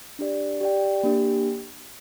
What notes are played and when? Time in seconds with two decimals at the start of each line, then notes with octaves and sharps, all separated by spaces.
0.19 D4 G4 D5
0.61 G4 D5 G5
1.03 A#3 D4 G4